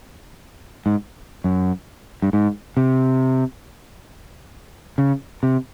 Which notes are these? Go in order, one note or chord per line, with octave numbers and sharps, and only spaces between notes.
G#2
F#2
G2
G#2
C3
C#3
C3